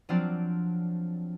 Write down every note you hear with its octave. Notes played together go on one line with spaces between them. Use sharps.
F3 F#3 C4 D4 F4 D5